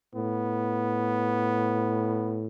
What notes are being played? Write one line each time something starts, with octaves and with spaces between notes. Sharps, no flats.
A2 B3